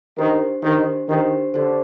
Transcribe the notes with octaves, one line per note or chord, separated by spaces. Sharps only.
D#3 D4 G4 C5
D#3 D4 G4 C5
D#3 D4 G4 C5
D3 D4 G4 C5